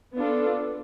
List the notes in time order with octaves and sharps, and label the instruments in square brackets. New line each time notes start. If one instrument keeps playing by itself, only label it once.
[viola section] B3 D4 F4 A4